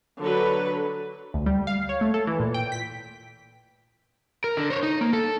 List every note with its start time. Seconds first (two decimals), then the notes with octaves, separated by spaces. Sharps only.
0.19 D3 F#3 B4
1.34 D2
1.46 G3
1.67 F5
1.89 C#5
2.01 A3
2.14 A4
2.27 E3
2.40 A#2
2.54 G5
2.72 B6
4.44 A#4
4.57 D3
4.70 C5 C#5
4.83 D#4
5.01 A#3
5.13 A4